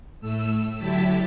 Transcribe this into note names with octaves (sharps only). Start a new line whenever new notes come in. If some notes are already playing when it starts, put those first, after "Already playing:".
A2 A3 E6
D3 F#3 E4 G4 A5 B6